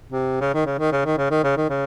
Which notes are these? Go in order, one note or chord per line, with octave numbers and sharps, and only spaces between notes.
C3
C#3
D#3
C#3
D#3
C#3
D#3
C#3
D#3
C#3
D#3
C#3